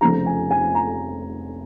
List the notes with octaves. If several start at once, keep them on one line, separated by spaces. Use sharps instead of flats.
F1 F2 C#3 F3 A#5
G#5
G#5
A#5